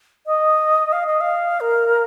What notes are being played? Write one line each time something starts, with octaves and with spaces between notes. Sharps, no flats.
D#5
F5
D#5
F5
A#4